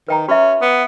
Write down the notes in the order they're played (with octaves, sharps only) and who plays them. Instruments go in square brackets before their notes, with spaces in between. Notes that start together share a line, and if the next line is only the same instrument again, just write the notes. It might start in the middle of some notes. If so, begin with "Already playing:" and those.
[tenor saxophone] D#3 [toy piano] B4 G5 A#5
[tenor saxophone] C#4 [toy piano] F#4 E5
[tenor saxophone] B3